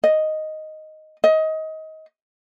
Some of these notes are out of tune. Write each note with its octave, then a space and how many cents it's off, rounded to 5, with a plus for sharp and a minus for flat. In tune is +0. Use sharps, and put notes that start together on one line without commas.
D#5 +0
D#5 +25